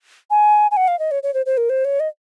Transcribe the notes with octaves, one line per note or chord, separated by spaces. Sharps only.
G#5
G#5
F#5
F5
D#5
C#5
C#5
C5
C5
A#4
C5
C#5
D#5